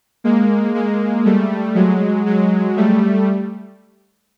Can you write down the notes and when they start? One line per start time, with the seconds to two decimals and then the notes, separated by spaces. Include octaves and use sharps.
0.24 G#3 A#3
0.75 G#3 A#3
1.25 G3 A3
1.75 F#3 G#3
2.26 F#3 G#3
2.77 G3 A3